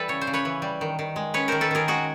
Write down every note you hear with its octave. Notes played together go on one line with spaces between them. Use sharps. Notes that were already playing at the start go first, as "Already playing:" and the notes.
Already playing: E3 G3 A4 B4
C#3 C#5
C5
C#3
B4 C#5
E3
G3
D#3
D#3
G#3
C#4 B4 C#5
D#3 A#4 C5
A4 B4
D#3 G#4 A#4
G#3 F#4 G#4